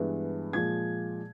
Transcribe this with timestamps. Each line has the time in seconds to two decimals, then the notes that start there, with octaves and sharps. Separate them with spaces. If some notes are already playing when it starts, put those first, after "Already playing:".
Already playing: G2 E3 G#3 B3
0.53 A#2 F3 G#3 G#6